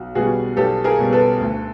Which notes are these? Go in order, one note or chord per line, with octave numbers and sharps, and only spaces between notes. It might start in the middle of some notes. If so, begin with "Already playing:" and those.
Already playing: B1 F#4
B2 G3 F#4 G#4
B1 G4 A4
G#4 A#4
B2 G3
A4 B4
D2